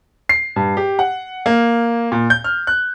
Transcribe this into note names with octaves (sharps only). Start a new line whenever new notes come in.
C7
G2
G4
F#5
A#3
A#2
G6
F6
F#6